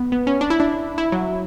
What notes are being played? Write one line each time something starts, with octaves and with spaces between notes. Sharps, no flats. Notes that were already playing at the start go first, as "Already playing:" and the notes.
Already playing: B3
B3
C#4
D4
E4
D4
E4
F#3